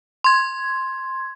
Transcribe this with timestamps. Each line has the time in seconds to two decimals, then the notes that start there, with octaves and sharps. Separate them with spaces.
0.24 C6 G#6